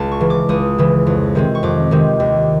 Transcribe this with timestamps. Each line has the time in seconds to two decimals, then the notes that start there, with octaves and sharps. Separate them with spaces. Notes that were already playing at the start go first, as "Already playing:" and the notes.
Already playing: C#2 A5
0.12 C#6
0.20 C#3 E3
0.30 D6
0.49 C#2 D#6
0.78 C#3 E3
1.07 F2
1.35 C3 D#3 G#3 C4
1.55 C#6
1.63 F2 D6
1.91 C3 D#3 G#3 C4
2.20 D#2